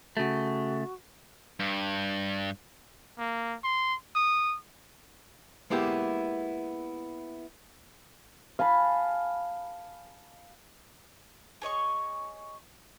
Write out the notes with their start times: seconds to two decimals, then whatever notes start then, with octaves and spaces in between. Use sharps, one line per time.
0.17 C#3 A3 F#4
1.60 G2
3.18 A#3
3.64 C6
4.15 D#6
5.70 G#3 A#3 B3 E4 G4
8.59 F5 G#5 A5 B5
11.62 G#4 C#5 D#5 C#6